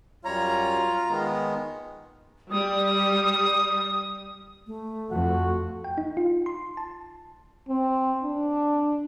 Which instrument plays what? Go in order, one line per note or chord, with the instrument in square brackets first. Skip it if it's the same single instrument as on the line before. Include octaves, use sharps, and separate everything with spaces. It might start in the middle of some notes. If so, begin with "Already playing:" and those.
[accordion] F#2 G3 C#5 [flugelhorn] F4 [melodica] A#5
[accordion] D#3 G#3 B3
[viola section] G3 [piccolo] D#6
[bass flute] A3
[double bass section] F2 [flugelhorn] F#4
[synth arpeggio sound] G5
D#4
F4
C6
A5
[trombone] C4
D4